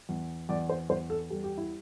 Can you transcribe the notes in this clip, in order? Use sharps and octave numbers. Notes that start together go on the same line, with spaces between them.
E2
E2 D5
C5
E2 C5
A4
G3 A4
G4
E4